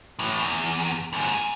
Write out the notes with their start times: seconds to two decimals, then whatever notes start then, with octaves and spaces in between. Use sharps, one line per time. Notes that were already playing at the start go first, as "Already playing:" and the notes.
0.19 A2 E3
0.42 E2
1.13 D#2 G#2
1.34 E2 G#5